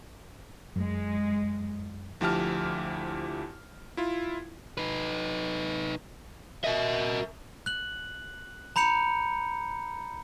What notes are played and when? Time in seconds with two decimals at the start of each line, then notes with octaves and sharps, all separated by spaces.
0.76 F#2 G#3
2.21 D2 F3 E4 G4 A5 F6
3.97 E4 F4
4.77 D#4 B4
6.64 F#4 A#4 D#5 E5
7.66 F#6 F#7
8.76 A#5 B5 G6 C#7 F7